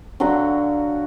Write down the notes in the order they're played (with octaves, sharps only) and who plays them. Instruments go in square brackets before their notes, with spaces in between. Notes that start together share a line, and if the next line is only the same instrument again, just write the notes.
[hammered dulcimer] D3 F#3 F#4 F5